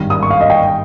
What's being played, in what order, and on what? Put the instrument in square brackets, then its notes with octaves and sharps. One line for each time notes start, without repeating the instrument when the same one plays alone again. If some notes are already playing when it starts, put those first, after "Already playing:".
Already playing: [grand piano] G#1 G2 D#3
[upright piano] D#6
C#6
F5
D#5
G5